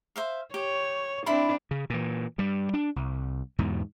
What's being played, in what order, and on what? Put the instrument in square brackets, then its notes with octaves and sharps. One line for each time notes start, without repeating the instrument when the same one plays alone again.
[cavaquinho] C5 E5 F5
[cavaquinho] G4 [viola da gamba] C#5
[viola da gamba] C4 D4 [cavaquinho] E4 B5 C6
[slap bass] C#3
A#2 E3
G2 G3
D4
C2
E2 G#2 B2